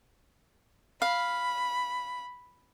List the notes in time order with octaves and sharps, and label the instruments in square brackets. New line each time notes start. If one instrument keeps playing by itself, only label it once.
[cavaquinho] F5 [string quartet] B5